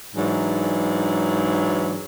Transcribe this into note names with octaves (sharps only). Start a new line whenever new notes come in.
G#2 E3 F#3 D4